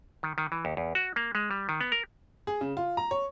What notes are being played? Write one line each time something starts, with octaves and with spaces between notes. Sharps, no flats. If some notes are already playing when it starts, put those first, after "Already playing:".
D#3
D#3
E3
D#2
E2
F#4
A#3
G#3
G3
D#3
B3
A#4
G#4
C#3
F4
A#5
C#5